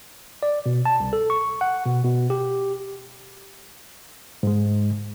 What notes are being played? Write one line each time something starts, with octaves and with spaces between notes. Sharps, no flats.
D5
B2
A5
C2
A4
C#6
F#5
B2
B2
G4
G#2 G#3